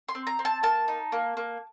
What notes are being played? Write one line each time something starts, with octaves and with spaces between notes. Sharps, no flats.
C6
C4
A#5
C4
A5
A#3 A5
D#4
A#3
A#3